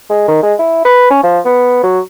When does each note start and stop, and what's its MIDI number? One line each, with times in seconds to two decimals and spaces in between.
0.10 0.27 56
0.28 0.40 51
0.43 0.54 56
0.59 0.84 64
0.85 1.10 71
1.10 1.22 61
1.23 1.39 53
1.45 1.81 59
1.83 1.99 54